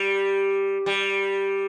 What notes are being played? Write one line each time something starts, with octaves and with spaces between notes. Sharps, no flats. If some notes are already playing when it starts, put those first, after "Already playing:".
Already playing: G3
G3